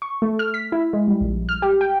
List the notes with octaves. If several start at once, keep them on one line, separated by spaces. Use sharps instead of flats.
C#6
A3
F6
B6
E4
G#3
G3
A#1
F6
G4
G5